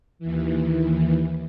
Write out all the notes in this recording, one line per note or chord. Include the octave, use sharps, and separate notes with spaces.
D#2 E3